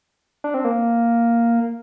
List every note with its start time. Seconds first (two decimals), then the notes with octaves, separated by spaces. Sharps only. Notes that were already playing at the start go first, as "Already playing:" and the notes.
0.44 D4
0.54 C4
0.65 A#3